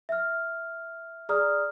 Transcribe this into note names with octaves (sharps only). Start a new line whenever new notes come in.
E5 F6
G#4 D5 A#5 D#6 F6